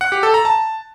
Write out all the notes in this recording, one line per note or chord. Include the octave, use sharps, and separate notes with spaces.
F#5
G4
A4
A#5
A5